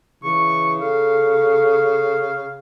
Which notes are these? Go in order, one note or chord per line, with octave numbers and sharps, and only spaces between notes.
C#3 E3 C#6
A4 F5